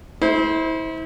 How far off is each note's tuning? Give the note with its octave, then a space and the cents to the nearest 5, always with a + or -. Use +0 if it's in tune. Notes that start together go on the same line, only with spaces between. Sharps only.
E4 -35 C5 +0